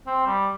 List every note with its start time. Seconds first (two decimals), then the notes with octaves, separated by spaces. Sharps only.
0.07 C4
0.27 G3